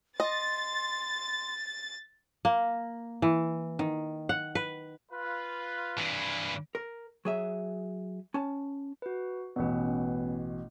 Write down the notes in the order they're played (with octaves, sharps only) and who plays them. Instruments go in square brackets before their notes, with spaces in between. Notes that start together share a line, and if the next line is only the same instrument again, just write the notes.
[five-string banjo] D#5 [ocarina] C6 [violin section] A6
[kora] A#3
E3
D#3
F#5
B4
[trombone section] F4 B4
[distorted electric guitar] G2 E3
[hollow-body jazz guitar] A#4
F#3 G#4 E5
C#4 A5
[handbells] F#4 B4
[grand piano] A1 B2 [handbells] B3 C#4 B4